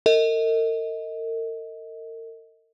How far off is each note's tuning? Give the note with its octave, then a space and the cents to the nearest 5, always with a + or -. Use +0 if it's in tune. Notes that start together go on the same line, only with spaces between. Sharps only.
A#4 -40 D#5 +25